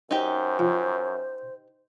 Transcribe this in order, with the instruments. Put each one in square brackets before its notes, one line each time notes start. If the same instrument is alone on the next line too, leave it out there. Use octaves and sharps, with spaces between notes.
[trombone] F#2 [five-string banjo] D#4 G4 [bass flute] C5
[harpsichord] F3